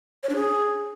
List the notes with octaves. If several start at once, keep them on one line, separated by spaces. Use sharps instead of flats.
C#5
D4
G#4